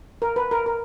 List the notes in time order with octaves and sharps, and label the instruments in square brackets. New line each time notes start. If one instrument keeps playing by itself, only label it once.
[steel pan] A#4
B4
A#4
A#4